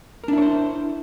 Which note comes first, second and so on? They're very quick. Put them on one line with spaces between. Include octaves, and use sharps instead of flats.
A#4 D4 E4 C#5 C5